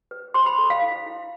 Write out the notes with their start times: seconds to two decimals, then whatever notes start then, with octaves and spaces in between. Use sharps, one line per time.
0.11 B4
0.34 C5 C6
0.46 B5
0.59 A4
0.70 F5
0.82 E4
1.06 E4